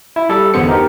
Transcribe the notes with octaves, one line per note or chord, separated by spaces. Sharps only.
E4
G3 A4 D5
G1 E2 D3 B3 C5 C#7
D#4 G4 A#4